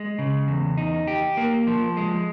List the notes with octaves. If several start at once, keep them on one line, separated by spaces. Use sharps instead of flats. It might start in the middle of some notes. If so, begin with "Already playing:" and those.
Already playing: G#3
C#3
E2
D#4
G4
A#3
F3
G#3